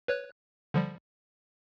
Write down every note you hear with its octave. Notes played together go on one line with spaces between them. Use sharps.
B4 C#5 F#6
D3 F3 G3